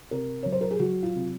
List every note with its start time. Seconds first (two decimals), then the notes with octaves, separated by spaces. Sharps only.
0.11 C3 A#4
0.43 F#3 C#5
0.52 C5
0.61 A#4
0.71 G#4
0.80 F#3 F#4
1.03 F4
1.15 C3